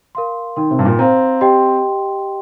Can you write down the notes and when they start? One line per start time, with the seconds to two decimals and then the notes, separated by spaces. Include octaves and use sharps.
0.15 A#4 F5 C6
0.56 D#3 D#4 A#4 G5 C6
0.71 C3
0.79 G2
0.85 A#2
0.99 C4 C5 F5 A#5
1.41 G4 D#5 G5 C6